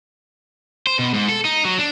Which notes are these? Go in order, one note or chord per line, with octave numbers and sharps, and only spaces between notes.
C5
B2
G#2
A4
D#4
F#3
D4